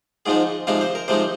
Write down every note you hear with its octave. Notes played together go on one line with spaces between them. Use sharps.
G#2 F3 G#3 D#4 G#4
C3 F3 G#3 D#4 F5
C5
A#4
C3 F3 G#3 D#4 C5